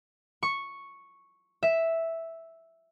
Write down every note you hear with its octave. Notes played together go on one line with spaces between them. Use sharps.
C#6
E5